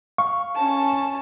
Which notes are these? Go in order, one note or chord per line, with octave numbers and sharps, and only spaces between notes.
F5 C#6
C#4 A5